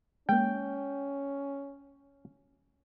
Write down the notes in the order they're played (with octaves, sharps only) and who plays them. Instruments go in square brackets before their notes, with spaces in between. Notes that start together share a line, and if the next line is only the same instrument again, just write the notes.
[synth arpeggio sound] G#3 A#3 [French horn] C#4 [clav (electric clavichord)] G5